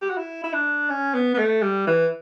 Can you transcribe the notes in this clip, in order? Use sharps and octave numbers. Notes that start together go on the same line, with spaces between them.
G4
F#4
E4
E4
D4
C#4
B3
B3
A3
G3
E3